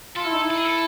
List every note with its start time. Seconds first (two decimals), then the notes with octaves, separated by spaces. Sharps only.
0.16 F4 A4
0.24 E4
0.33 D#4
0.41 E4
0.50 A4
0.57 G#4
0.64 A4